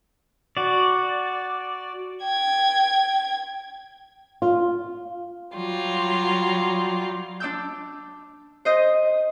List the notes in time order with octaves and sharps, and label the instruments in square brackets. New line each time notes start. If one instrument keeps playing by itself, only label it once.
[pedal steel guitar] F#4 D5
[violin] G5 G#6
[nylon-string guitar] F4
[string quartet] F#3 G3 F4
[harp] D4 D6 E6 G6
C5 D#5 G6